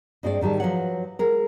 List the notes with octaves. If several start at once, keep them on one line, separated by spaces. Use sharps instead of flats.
G2 G#3 C4 G4 D5
G#2 D#3 G3 G#4 A5
F3 F#3 B4 C#5 F#5
G#3 A#4